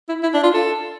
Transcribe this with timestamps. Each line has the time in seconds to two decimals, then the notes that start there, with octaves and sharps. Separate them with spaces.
0.09 E4
0.23 E4
0.34 D4
0.43 F4
0.54 A4